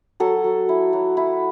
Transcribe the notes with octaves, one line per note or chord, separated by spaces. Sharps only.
F#3 A4
F#3
E4
F#3
E4